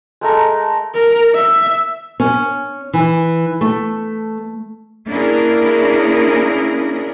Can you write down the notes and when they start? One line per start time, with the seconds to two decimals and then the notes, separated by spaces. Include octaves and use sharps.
0.21 G#3 A3 A#4
0.94 A#4
1.34 E5
2.20 C#4
2.93 E3
3.61 A3
5.09 A#3 C#4 D4 E4 G#4 A#4